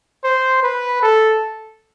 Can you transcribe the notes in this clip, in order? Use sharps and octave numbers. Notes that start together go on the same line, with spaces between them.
C5
B4
A4